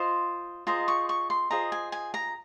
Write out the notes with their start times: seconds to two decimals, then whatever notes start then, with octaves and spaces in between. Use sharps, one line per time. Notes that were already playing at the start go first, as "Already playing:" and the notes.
Already playing: F4 C5 D#5
0.67 F4 G#4 C5 D#5 A#5
0.88 C#6
1.09 C#6
1.30 C6
1.51 F4 G#4 C5 D#5 A#5
1.72 G#5
1.92 G#5
2.14 A#5